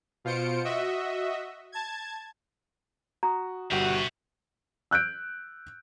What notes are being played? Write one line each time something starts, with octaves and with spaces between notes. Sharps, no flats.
B2 F4 C5 C#7 D7
F#4 D#5 E5
A5 G#6
F#4 A#5 D#6
G1 G3 F#4 E5 G5
E6 F#6 G6 D7